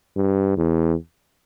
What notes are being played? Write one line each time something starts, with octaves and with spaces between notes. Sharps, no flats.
G2
E2